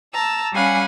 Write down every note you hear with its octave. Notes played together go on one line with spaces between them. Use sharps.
A5 A#5 E6
G3 C#4 F5 F#5 G#5 B5